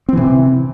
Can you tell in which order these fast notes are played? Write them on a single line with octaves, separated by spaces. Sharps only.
C4 E3 C3